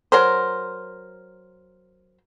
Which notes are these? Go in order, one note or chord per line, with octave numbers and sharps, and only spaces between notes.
F#3 A#4 C5